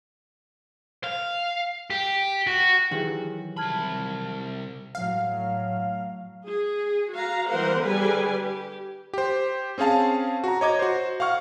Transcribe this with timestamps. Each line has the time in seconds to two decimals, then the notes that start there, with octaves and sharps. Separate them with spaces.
1.04 F5
1.90 G4
2.47 F#4
2.92 D#3 E3 F#3 G4 G#4 F#7
3.57 C2 A5 B5 F6 G#6
4.95 A2 F#3 F5
6.49 G#4
7.13 F#4 F5 A#5
7.49 E3 G3 B3 A#4 C5 F#5
7.82 D3 G3 G#4 B4 G#5
8.39 G4
9.14 G4 C5
9.78 C4 C#4 G#4 F5 A5
10.44 F#4 A#5
10.61 C#5 D#5 D6 G#6
10.79 F#4 C5
11.20 F5 F#5 C#6 F6